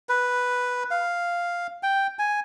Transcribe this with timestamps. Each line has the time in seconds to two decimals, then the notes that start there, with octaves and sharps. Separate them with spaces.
0.09 B4
0.91 F5
1.83 G5
2.19 G#5